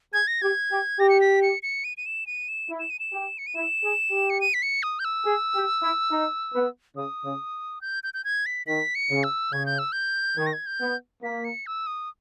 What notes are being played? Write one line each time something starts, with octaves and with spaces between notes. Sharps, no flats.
G#4 G#6
A#6
G4 G#6
G4
G4 A#6
C#7
B6
C#7
C#7
D#7
D#7
E7
D#7
E7
E4
E7
D#7
E7
G4
C#7
D#7
E4 E7
G#4
G4
C#7
D#7
B6
C#7
D#6
G6
E6
G#4
G4
E4
D#4
B3
C#3 D#6
C#3
G6
G6
G6
G#6
B6
D#3 B6
C#7
C#3
E6
C#3 G#6
G6
E6
G6
D#3 G#6
A#6
G#6
G6
B3
A#3 B6
C#7
E6
D#6